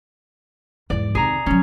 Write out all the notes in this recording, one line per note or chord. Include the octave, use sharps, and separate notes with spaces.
E2 G#2 D5
D#2 C3 G#4 A#5
D#3 F#3 C#4